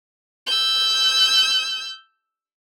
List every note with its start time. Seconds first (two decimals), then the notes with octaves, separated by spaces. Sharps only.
0.46 E6 G6